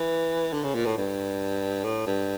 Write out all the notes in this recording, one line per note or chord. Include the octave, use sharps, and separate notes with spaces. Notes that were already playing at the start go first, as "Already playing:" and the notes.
Already playing: E3
D3
C#3
A#2
A2
G2
A2
G2